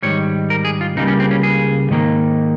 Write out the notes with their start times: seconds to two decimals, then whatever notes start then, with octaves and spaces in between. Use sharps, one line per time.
0.03 G#2 D#3 G3 C#5
0.50 A#4
0.65 G#4
0.81 F4
0.96 C#2 C#3 G3 A#3 D#4
1.07 C#4
1.20 C4
1.31 C#4
1.43 G#4
1.90 G#2 D#3 A#3